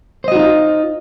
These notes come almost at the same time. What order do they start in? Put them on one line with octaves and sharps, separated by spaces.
C5 D#5 F#4 D#4 F4